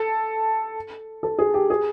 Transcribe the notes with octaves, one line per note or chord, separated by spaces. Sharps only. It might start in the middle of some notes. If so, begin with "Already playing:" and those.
Already playing: A4
A4
G#4
G4
G#4